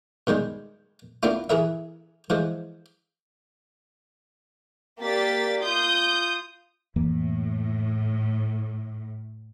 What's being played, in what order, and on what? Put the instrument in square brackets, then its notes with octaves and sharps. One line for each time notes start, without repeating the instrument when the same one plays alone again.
[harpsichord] B2 D#3 G3 G#3
A#3 B3 D4 E4 F4
E3 G#4 A#4 E5
E3 F3 G#3
[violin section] A#3 G4 D5 A6 B6
F4 D#6 G6
[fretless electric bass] F2 E3 A#3 [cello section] A2